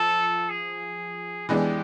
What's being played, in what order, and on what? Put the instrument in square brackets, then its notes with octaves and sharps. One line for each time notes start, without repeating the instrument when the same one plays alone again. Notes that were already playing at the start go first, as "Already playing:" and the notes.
Already playing: [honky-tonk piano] F3 [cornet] A4
[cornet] G#4
[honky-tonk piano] E3 G#3 B3 D4 [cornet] G4